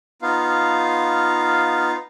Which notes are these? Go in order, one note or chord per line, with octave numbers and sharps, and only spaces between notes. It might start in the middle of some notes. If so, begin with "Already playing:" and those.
B3 D#4 F4 F5